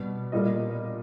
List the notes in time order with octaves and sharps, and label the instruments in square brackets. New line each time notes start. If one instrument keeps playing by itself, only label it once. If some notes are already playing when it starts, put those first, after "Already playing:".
Already playing: [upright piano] B2 G3 B3
A#2 G3 A#3 D#5